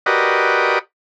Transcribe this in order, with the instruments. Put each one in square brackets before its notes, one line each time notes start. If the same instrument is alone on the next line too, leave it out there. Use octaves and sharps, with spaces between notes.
[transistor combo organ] F#4 G4 A#4 B4 D5 D#5